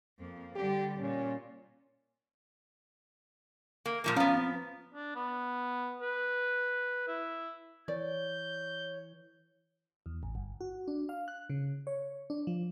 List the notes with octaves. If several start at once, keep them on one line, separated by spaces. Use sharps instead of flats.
F2 A#3
D3 G3 G4
A#2 C#4
A#3
A#2 F3 A#3
F3 B3 C#4 F5 A#5
C4
D4
B3
B4
E4
E3 C#5 D5 G6
E2
A1
G1
F#4
D4
F5
F#6
C#3
C#5
D4
F3